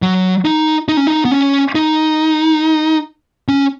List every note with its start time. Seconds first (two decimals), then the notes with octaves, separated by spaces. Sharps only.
0.02 F#3
0.45 D#4
0.88 D#4
0.97 C#4
1.07 D#4
1.25 B3
1.31 C#4
1.75 D#4
3.48 C#4